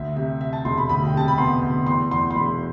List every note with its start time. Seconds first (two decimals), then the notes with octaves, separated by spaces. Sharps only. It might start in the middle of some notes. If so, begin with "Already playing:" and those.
Already playing: D2 E5
0.16 C3 E5
0.41 C3 E5
0.53 A5
0.65 E1 C6
0.77 B5
0.89 D2 B5
1.06 G5
1.14 C3 A5
1.28 B5
1.38 B3 C6
1.62 D2
1.86 E2 C6
2.11 E2 C6
2.31 C6
2.35 E1 B5